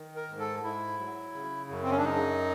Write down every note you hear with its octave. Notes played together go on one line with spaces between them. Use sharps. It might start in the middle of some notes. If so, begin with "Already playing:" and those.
Already playing: D#3
A#4
G#2
A4
G#2 E4
F#3
C#3
F#2
C4
C#4
D4
F#2 D#4